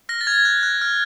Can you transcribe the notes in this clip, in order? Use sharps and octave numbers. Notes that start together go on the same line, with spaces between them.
F6 A#6
A6
F6 G#6
F#6
F#6
F6